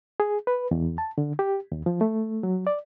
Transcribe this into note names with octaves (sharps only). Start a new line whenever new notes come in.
G#4
B4
E2
A5
D3
G4
D#2
F3
A3
F#3
D5